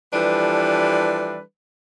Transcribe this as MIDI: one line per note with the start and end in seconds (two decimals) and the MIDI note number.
0.13 1.40 52
0.13 1.40 53
0.13 1.40 55
0.13 1.40 62
0.13 1.40 69
0.13 1.40 71